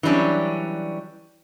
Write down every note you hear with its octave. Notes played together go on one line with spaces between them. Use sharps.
E3 F#3 G3 C#4 D4